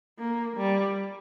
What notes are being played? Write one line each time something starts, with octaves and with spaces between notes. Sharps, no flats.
A#3
G3